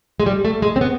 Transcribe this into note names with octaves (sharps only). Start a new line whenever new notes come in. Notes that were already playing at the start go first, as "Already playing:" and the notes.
G#3
G3
A3
G#3
C4
B3